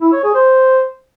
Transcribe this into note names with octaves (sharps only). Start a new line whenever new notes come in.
E4
C#5
G#4
C5